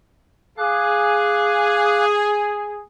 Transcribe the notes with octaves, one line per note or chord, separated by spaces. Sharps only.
G#4 F5 D6 F#6